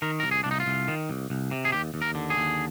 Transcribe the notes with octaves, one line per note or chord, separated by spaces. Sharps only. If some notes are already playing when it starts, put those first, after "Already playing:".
D#3 A#4
C2 A#4
G#4
C2 D4
D#4
F4
C2
D#3
C2
C2
C3
G#4
D#2 G4
D#2
A#4
D3
G#4
D#2